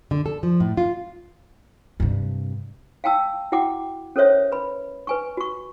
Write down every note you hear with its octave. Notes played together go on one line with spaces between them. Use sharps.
D3
A4
F3
A2
F4
G2 C3
F5 G5 A5 E6
E4 F#4 F#5 G5 D6
C#4 A4 A#4 C5 C#5 E5
B4 B5
B4 G#5 C#6
F#4 C#6